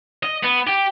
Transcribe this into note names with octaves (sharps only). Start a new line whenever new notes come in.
D#5
B3
G4